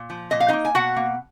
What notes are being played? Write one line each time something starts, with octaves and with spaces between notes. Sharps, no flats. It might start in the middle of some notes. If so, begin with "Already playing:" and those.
Already playing: A#2
F3
A#2 D#5
F5
A#3 D#4 D#5
G#5
B2 F#4 F#5
A#3